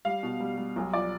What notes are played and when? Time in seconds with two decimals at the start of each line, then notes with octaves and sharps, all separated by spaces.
0.05 G3 F5
0.23 B2
0.40 G3
0.58 G3
0.76 B1
0.93 F3 D5